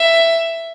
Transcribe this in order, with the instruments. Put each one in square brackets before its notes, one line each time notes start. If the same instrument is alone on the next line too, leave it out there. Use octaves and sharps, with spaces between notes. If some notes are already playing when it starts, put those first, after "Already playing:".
Already playing: [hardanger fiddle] E5